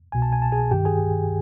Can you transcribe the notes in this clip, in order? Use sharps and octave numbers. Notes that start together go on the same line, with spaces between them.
C2 B2 G#5
A5
G#5
A5
G#4 G#5
G2 D#3 G4 G5
G#4 G#5